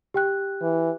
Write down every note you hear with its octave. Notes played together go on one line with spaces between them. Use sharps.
G4 G5 F#6
E3